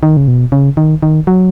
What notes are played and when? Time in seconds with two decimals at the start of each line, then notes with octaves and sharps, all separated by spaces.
0.03 D#3
0.17 C#3
0.28 B2
0.52 C#3
0.77 D#3
1.03 D#3
1.27 F#3